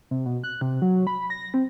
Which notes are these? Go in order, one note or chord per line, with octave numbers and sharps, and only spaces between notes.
C3
B2
F#6
C3
F#3
B5
A#6
C4